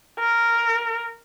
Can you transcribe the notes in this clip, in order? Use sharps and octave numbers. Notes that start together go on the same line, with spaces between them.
A#4